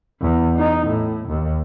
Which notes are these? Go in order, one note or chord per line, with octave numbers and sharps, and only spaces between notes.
E2
D#4
A2
D#2